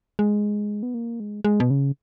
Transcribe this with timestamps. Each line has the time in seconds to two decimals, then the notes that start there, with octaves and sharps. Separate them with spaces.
0.19 G#3
0.83 B3
0.94 A#3
1.20 G#3
1.44 G#3
1.60 B2
1.70 C#3